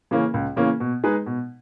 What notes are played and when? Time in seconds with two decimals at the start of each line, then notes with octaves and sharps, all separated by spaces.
0.11 C#3 E3 A#3 C#4
0.34 C#2
0.56 C#3 E3 A#3 C#4
0.80 B2
1.04 G#3 D#4 G#4 B4
1.26 B2